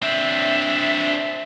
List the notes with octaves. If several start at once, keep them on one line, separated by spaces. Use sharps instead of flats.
C4 D4 E5